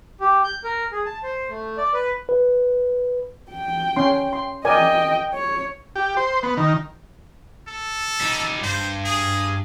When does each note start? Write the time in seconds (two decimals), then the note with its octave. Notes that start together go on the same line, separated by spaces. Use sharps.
0.21 G4
0.44 G6
0.64 A#4
0.92 G#4
1.06 A5
1.23 C5
1.50 A3
1.77 D5
1.94 B4
2.29 B4
3.51 G5
3.96 C#4 C6
4.33 C6
4.65 A#4 D5 D#5 G5 G#5
5.34 C#5
5.96 G4
6.17 C5
6.43 B3
6.57 D#3
7.68 A4
8.21 G3 D#4
8.62 G2 C5
9.05 G#4